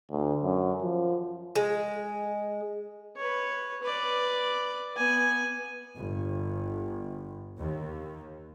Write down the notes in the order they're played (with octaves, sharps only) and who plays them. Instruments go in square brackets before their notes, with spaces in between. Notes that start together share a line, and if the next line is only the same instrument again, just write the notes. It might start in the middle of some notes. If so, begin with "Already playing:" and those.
[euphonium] D2
F#2
F3
[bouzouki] G#3
[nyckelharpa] B4 C#5
B4 D5
B3 G#5
[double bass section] G1
D#2